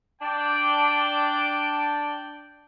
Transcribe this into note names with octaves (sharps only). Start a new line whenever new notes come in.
D4 D5 G5